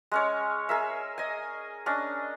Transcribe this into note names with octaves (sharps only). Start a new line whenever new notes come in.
G#3 C#4 C#5
G#4 A#4 E5
D#5 G#5
C#4 D4 D#5